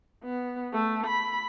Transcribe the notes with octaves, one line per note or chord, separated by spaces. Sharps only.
B3
A3
B5